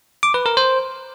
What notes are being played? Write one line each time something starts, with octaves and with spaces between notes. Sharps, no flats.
D6
B4
A#4
C5